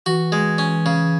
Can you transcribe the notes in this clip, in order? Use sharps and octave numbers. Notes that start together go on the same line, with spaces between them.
E3 F#4
G#3
C#4
C#3